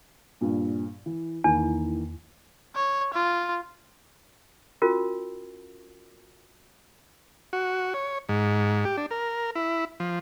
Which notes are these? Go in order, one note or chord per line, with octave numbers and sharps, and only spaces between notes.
G2 A#2
E3
E2 D#3 E3 A#3
C#5
F4
C#4 F4 F#4 A#4
F#4
C#5
G#2
G4
D4
A#4
E4
F3